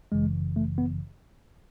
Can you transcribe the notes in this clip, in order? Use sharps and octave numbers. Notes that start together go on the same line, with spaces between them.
G1 F#2 C#3 E3 G#3
A3
B3